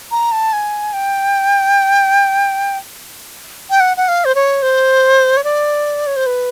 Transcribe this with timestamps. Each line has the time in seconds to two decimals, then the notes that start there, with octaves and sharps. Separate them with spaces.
0.11 A#5
0.32 A5
0.53 G#5
0.93 G5
3.70 G5
3.80 F#5
3.97 F#5
4.08 F5
4.25 C5
4.35 C#5
4.62 C5
5.37 C#5
5.44 D5
6.07 C#5
6.16 C5
6.26 B4